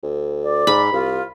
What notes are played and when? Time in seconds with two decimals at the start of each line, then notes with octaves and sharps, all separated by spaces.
0.03 D2
0.43 D5
0.67 G#2 B5
0.92 C2 F4